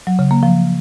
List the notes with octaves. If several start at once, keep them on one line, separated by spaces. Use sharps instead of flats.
F#3
C#3
A#3
F3